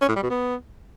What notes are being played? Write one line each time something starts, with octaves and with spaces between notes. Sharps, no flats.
C#4
A2
G3
B2
B3